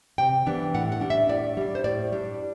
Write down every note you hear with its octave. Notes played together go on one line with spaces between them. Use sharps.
C3 G5
E3 G3 B3 D4
A2 F#5
F#5
G3 D4
E5
A2 D5
G3 D4
C5
A2 D5
G3 D4